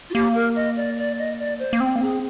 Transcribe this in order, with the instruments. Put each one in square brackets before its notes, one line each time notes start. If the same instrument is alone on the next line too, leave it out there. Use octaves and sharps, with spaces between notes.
[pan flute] F4
[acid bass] A#3 [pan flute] G4
[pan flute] A#4
D#5
D5
D5
D#5
D5
C5
[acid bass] A#3
C4
A#3
[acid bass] C4 [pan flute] G#4